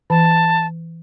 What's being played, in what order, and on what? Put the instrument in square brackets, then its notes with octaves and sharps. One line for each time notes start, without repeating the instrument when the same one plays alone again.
[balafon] E3 [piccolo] A5